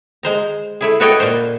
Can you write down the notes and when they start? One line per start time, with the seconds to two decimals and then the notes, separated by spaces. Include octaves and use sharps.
0.23 G#3 C5 A#5
0.81 A3 E4 G#4
1.00 F#4 A4 B4 C#5 D#5 G5
1.20 A#2 C5